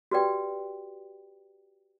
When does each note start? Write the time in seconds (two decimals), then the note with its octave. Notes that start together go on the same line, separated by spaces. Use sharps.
0.11 F#4 G4 B4 D5 G5